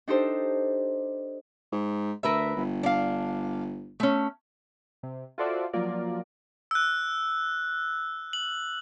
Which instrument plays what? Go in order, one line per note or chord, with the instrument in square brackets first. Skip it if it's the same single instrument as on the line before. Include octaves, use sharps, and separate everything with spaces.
[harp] D4 D#4 G4 A4 C5
[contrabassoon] G#2
[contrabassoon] D2 [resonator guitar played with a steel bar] A#4 B4 E5
[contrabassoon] G1
[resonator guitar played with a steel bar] D4 F5
A3 C#4
[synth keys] C3
F4 F#4 A4 C5 D5 E5
F3 F#3 A#3 F4 A#4 D5
[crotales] E6 F#6
F#7